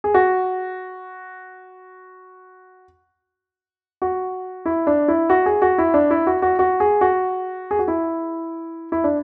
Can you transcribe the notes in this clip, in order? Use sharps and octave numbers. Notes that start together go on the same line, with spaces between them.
G#4
F#4
F#4
E4
D4
E4
F#4
G#4
F#4
E4
D4
E4
F#4
F#4
F#4
G#4
F#4
G#4
F#4
E4
E4
D4